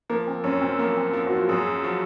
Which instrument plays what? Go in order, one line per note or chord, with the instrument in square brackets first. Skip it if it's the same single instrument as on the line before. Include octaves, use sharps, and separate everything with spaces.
[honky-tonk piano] F3 [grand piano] A#3
[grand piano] C4
[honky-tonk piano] F#2 [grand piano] C#4
[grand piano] C4
[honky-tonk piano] F3 [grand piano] A#3
[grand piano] C4
[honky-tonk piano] F3
[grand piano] F#4
F4
[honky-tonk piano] F#2 [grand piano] G#4
[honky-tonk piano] F3 [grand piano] F#4